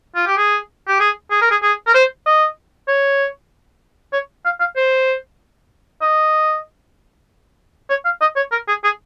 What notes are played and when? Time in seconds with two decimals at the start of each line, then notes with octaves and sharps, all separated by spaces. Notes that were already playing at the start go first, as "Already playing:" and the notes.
0.16 F4
0.27 G4
0.37 G#4
0.88 G4
1.00 G#4
1.31 G#4
1.41 A#4
1.51 G#4
1.63 G#4
1.87 A#4
1.94 C5
2.26 D#5
2.88 C#5
4.13 C#5
4.45 F5
4.60 F5
4.77 C5
6.01 D#5
7.90 C#5
8.05 F5
8.21 D#5
8.36 C#5
8.52 A#4
8.68 G#4
8.84 G#4